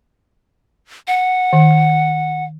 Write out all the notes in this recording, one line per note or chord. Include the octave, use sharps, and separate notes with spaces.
F#5
D#3